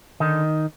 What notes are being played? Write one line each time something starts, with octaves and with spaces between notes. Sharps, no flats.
D3 D#3 D#4